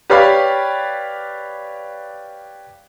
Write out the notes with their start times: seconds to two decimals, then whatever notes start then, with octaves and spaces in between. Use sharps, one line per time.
0.10 G4 B4 C#5 D5 F5 B5